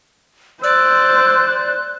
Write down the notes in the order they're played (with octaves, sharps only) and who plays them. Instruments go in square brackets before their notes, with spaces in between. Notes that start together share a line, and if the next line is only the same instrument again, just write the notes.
[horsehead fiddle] C5 [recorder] D5 [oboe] E6 [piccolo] F#6